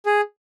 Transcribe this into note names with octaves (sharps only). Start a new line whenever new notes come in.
G#4